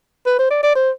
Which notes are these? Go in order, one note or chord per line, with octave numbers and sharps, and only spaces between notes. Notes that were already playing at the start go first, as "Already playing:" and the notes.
B4
C5
D5
D5
C5